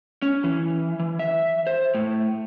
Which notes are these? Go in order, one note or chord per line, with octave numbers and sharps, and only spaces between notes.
C#4
E3
E3
E5
C5
A2